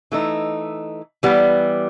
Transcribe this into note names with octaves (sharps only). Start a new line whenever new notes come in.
E3 A3 D#4
E3 G3 B3